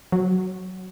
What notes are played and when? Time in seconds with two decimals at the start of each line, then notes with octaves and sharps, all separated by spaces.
0.12 F#3